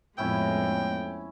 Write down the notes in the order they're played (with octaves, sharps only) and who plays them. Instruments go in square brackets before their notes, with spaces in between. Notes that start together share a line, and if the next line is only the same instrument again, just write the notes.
[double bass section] F2 A2 B3 [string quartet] G#3 [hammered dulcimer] C#4 E4 E5 [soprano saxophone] G5